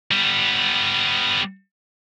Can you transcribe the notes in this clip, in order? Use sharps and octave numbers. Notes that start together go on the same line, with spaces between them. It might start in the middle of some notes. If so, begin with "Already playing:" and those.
G3 B3